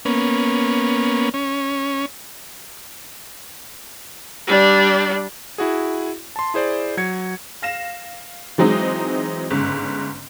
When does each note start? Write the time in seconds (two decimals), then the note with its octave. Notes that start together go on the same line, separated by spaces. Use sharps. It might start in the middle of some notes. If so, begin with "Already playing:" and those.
0.05 A#3 B3 C#4
1.34 C#4
4.47 G3 D4
5.58 E4 F#4 G#4
6.36 A5 C6
6.54 E4 G#4 C5 D5
6.97 F#3 G#6 C#7
7.62 F5 A#6 E7
8.58 E3 F#3 G#3 C4 D#4
9.51 G1 G#2 C#3